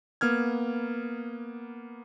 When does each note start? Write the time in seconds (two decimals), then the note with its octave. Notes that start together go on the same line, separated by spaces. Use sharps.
0.21 A#3 B3 F6 G#6